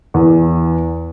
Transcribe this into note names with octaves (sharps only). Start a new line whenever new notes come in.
E2